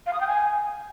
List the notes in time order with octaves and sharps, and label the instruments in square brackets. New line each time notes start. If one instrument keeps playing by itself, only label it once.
[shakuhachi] F5
D#6
G5
G#5